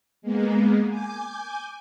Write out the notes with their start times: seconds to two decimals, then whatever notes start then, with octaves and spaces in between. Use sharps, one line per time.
0.22 G#3 A#3 B3
0.89 G#5 D6 G6